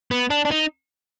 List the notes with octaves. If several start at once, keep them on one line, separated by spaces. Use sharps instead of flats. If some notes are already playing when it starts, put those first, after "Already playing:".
B3
D4
D4
D#4